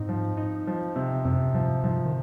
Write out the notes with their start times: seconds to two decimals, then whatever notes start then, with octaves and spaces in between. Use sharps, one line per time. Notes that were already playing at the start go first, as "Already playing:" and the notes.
Already playing: G#2 C4 D#4
0.09 F3
0.37 D#4
0.67 F3
0.96 C3
1.25 F#2 C3
1.54 G#2 F3
1.83 G#2 F3
2.06 D#3